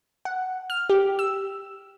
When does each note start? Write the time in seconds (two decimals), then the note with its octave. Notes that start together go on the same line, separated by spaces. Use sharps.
0.25 F#5
0.70 F6
0.90 G4
1.19 E6